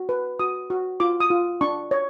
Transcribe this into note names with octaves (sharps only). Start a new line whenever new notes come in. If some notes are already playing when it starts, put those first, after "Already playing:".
Already playing: F#4
B4
F#4 D#6
F#4
F4 D6
D#6
F4
D4 C#6
C#5